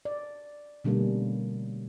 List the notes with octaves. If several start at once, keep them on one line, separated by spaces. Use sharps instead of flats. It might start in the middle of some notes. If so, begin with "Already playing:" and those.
D5
B2 D3 G3 A3 A#3 C#4